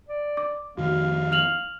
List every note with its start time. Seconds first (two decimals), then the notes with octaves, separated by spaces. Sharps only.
0.09 D5
0.37 D6
0.77 F2 D#3 A3 F#4 F5
1.32 F6 F7 F#7